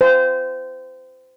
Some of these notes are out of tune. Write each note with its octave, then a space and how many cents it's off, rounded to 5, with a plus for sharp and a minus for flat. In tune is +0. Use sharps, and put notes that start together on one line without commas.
C5 -25